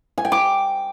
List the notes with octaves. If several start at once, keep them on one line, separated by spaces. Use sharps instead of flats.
G#5
G5
D6